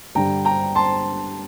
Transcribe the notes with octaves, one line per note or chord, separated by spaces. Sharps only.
G2 D3 G3 G5 A#5
G5 A#5
A5 C6